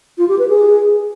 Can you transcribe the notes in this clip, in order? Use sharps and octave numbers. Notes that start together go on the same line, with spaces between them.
F4
G4
B4
G#4